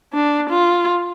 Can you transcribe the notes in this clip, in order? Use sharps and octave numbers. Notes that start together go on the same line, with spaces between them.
D4
F4